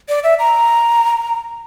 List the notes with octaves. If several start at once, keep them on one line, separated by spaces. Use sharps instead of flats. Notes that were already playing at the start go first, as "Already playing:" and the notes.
D5
E5
A#5